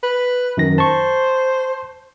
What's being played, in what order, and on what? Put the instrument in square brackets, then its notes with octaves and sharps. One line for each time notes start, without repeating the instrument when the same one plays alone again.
[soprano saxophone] B4
[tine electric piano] F#2 D#3 A#6
[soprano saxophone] C5 [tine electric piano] A5 C#6